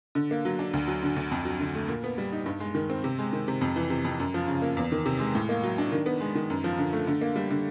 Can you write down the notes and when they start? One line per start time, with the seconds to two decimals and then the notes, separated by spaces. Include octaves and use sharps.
0.15 D3
0.31 A#3
0.45 F#3
0.59 D4
0.73 D2
0.87 F#3
1.03 D3
1.16 D2
1.31 F2
1.45 F#3
1.60 D3
1.75 A3
1.88 A#2
2.04 B3
2.18 G3
2.32 D#4
2.46 G2
2.60 G#3
2.75 D#3
2.90 C4
3.04 C3
3.19 G#3
3.33 D#3
3.48 C3
3.61 F2
3.76 E3
3.90 C3
4.04 F2
4.20 F#2
4.34 F3
4.48 C#3
4.62 A#3
4.77 E2
4.92 D#3
5.06 C3
5.20 G#3
5.35 A2
5.49 A#3
5.63 F#3
5.78 D4
5.92 D#3
6.06 B3
6.20 G#3
6.35 D#3
6.50 F#2
6.64 F3
6.78 D3
6.93 A3
7.07 D3
7.21 A#3
7.35 G3
7.51 D3